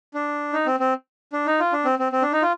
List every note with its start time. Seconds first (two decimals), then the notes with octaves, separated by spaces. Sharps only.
0.14 D4
0.53 D#4
0.66 C4
0.80 C4
1.33 D4
1.46 D#4
1.60 F4
1.73 D4
1.85 C4
1.99 C4
2.12 C4
2.22 D4
2.32 D#4
2.42 F4